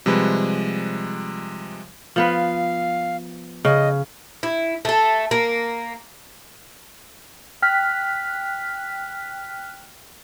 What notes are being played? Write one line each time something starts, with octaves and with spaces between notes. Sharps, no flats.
C3 F3 G3 G#3 B4
F3 B3 B4 F5
C#3 D#5
E4
A3 A4
A#3
G5 F6 F#6 B6